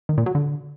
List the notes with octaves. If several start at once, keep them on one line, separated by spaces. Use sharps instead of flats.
D#3
A#2
F#3
D3